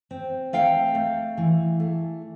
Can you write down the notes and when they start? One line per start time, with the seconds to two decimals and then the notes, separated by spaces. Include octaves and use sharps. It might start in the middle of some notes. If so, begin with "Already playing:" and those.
0.11 C4
0.53 A3 F5 G5
0.95 A3
1.37 E3
1.80 A3